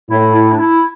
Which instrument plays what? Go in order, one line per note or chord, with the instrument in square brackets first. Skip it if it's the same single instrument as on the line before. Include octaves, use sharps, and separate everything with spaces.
[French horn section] A2 [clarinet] E4
[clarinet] E4
D4
E4